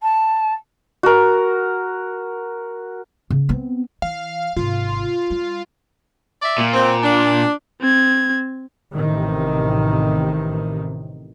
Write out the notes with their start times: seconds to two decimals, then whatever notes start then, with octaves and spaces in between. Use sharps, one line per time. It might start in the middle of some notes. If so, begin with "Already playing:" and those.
0.02 A5
1.03 F#4 A#4
3.30 C#3
3.49 B3 C4
4.02 E3 F5
4.56 G#1 C3 F4
5.30 G3
6.43 D5 E5
6.58 A#2
6.74 C4
7.03 D4
7.81 C4 G#6
8.94 A1 C3 D#3